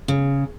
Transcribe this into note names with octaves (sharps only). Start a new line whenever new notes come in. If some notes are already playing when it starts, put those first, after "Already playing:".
C#3